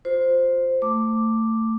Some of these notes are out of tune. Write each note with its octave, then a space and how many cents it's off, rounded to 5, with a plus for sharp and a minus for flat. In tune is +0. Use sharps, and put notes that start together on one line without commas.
F4 +30 C5 +0
A3 +25 D6 +0